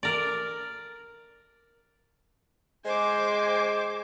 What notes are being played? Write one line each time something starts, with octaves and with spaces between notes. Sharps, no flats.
A#4 D5
G#3 C5 G#5 D6